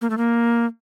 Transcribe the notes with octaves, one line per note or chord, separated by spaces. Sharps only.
A#3
A3
A#3